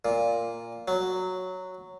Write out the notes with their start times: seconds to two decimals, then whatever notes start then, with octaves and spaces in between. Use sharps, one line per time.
0.05 A#2
0.88 F#3